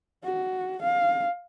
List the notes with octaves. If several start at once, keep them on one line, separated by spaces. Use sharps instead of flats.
F#4
F5